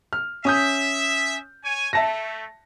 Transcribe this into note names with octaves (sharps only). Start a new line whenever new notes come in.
F6
C#4 E5 D#6 G6
C#5 G#5
A3 E5 A5 A#6